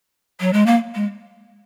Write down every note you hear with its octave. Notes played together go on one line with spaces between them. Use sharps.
F#3
G#3
A#3
G#3